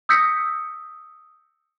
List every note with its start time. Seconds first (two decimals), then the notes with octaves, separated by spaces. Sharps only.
0.09 D#6 E6 G6 A#6 B6 C#7